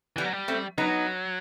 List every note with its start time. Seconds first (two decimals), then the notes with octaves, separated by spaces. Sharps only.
0.16 E3 G3 B3
0.24 F#3
0.33 G3
0.48 A3 C4
0.78 F#3 B3 D#4